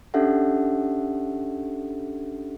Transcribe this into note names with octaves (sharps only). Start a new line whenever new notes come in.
C#4 D4 G4 A4 E5 F#5